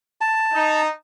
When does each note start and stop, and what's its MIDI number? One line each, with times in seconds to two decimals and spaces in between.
0.21 0.82 81
0.53 0.87 63